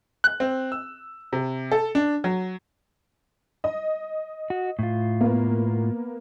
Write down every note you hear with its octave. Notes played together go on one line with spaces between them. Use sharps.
F#6
C4
E6
C3
A4
D4
F#3
D#5
F#4
A2 F4
A#3 B3